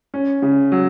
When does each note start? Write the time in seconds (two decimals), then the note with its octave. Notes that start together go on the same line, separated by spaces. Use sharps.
0.14 C#4
0.42 C#3
0.72 F#3